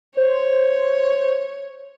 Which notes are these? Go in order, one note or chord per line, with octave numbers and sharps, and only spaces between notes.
C5 C#5